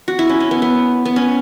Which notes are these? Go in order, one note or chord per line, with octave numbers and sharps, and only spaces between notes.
F#4
E4
C#4
C#4
B3
B3
B3
C#4